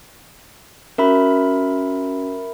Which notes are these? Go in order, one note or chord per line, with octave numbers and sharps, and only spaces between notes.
C#4 F#4 A#4 E5 B5